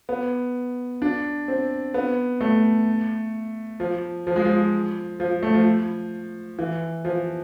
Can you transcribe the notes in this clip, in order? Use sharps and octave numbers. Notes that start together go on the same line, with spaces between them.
B3
D4
C4
B3
A3
F3
F3
G#3
F3
F3
A3
F3
E3
F3